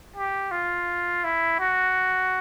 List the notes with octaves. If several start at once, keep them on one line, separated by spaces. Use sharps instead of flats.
G4
F4
E4
F#4